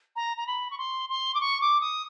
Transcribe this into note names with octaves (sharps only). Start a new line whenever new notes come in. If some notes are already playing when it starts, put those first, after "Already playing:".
A#5
A#5
B5
C#6
C6
C6
D6
C#6
D6
D#6